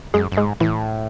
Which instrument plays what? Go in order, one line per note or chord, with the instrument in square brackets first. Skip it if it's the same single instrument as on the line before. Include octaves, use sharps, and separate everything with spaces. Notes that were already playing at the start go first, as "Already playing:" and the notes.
[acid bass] F#2 [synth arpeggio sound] G#3 G#4
[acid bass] F#2
[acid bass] G#2 [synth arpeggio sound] G#3 G#4
[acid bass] A2 [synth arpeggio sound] E3 E4